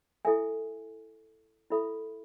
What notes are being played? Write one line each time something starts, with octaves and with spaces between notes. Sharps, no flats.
E4 A4 E5 G#5
E4 A4 E5 B5